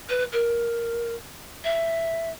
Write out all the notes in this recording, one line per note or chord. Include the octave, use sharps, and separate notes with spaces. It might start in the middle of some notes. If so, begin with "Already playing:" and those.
B4
A#4
E5